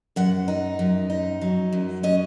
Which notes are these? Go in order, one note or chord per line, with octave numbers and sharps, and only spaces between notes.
F#2 F#5
D#4
F#2
D#4
F#3
F#2
C#4 D#5